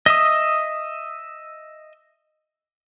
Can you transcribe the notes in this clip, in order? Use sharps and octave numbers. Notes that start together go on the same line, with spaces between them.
D#5 E5 D#6